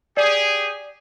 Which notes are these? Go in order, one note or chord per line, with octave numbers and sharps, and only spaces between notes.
G4 G#4 D5